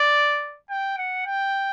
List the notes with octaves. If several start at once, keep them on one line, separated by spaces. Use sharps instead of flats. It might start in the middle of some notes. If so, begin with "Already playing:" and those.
Already playing: D5
G5
F#5
G5